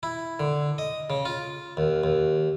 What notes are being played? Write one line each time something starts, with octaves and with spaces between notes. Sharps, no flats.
E4
D3
D#5
C#3
F4
D#2
D#2